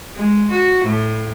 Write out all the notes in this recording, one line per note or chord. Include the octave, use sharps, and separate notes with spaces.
G#3
F#4
A2